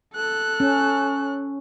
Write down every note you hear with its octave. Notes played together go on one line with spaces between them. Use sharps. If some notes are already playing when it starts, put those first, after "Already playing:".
A4 F#6
C#4